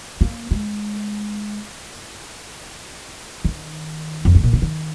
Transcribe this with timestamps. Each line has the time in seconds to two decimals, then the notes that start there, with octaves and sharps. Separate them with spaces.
0.21 A#3
0.51 G#3
3.45 D#3
4.25 F2
4.35 G#2
4.44 A#2
4.53 C#3
4.62 D#3